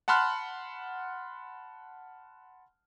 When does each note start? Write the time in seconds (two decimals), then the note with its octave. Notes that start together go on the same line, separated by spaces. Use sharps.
0.08 F#5 A5 B5 C6 F6 F#6